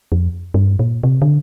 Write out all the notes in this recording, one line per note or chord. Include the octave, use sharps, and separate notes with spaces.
F2
G2
A#2
C3
D3